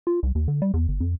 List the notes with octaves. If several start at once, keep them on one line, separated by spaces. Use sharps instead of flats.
F4
C2
D#2
D3
G3
E2
G1
F2